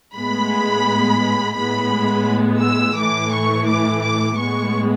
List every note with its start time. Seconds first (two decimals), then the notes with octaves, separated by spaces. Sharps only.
0.15 A2 G#3 B3 B5
1.56 A2 G#3 B3 B5
2.62 E6
2.97 A2 E3 A3 D6
3.32 C#6
3.67 D6
4.03 D6
4.38 A2 G#3 B3 C#6